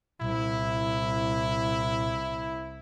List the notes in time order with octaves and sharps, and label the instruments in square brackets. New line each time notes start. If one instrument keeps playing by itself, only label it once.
[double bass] C2 [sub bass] A#2 [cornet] E4